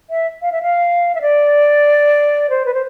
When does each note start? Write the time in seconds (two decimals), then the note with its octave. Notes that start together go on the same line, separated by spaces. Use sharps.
0.10 E5
0.42 F5
0.52 E5
0.62 F5
1.15 E5
1.21 D5
2.50 C5
2.66 B4
2.74 C5